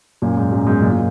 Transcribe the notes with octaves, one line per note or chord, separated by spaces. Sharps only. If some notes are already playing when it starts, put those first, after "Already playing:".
F#2 A#2
G#2
F#2
G#2 B2
F#2 A#2
A#2